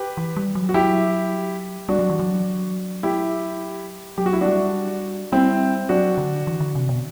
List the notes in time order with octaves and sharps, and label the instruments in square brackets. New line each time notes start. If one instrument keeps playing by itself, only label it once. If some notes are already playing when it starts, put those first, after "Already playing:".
Already playing: [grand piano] G4 B4
[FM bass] E3
G3
F#3
[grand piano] F#4
[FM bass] F#3 [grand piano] E4 G4
[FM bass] G3 [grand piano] D4 F#4
[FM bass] F#3
E3
F#3
[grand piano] E4 G4
[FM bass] F#3 [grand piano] G4
[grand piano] F#4
E4
[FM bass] G3 [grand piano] D4 F#4
[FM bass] G3 [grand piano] C4 E4
[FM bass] F#3 [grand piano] D4 F#4
[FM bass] D3
E3
D3
C3
B2